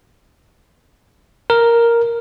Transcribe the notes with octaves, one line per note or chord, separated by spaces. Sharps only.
A#4